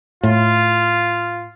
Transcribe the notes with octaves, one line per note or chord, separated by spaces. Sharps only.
A2 F4